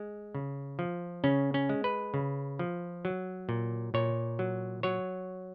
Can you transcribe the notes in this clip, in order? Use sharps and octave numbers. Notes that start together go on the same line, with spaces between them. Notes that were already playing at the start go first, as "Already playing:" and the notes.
Already playing: G#3
C#3
F3
C#3 C#4
C#4
G#3
B4
C#3
F3
F#3
A#2
A#2 C#5
F#3
F#3 C#5